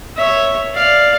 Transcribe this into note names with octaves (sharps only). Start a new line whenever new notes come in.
C#5 E5
D5 F5